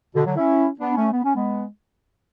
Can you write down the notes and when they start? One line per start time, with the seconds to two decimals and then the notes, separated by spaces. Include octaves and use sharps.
0.15 B2 D3
0.26 D3 F#3
0.37 C#4 E4
0.80 B3 D4
0.96 A3 C#4
1.13 B3
1.24 C#4
1.35 G#3 B3